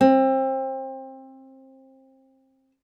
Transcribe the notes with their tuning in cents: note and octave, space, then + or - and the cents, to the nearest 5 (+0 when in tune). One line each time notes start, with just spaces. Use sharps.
C4 +25